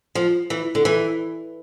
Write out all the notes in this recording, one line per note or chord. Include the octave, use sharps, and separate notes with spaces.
F3
E3
D3
E3